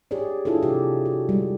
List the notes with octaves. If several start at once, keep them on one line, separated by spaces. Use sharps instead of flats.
G4 G#4 C#5 D5
D4 E4 F4 G#4 A4
C3 G4
F#4
G3 G#3